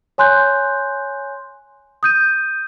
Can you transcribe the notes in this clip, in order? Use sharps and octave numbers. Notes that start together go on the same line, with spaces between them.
C#5 G#5 C6 F#6 G6
D#6 G6 D#7